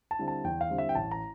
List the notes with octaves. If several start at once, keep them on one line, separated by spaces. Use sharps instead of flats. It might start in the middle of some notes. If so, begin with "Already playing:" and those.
A5
D3 G3 C4 E4
A5
E2 G5
F5
D3 G3 C4 E4
E5
G5
A1 A5
A#5